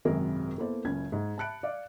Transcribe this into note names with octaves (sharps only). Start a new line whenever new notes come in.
G#1 F#2 C3 G#3 G#4 A#4
A#3 B3 E4 A4 C5
F#1 C#2 C#4 G#6
G#2
A5 B5 F#6 C#7 D7
D5 F5